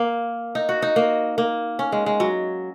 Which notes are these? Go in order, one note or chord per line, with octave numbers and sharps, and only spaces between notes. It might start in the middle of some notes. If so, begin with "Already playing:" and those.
Already playing: A#3
D#4
F#4
D#4
A#3
A#3
C#4
G#3
G#3
F#3